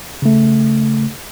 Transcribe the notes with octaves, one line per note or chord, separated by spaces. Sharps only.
C#3 A3